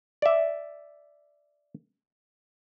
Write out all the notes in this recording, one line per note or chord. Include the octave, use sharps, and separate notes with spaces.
D5 E5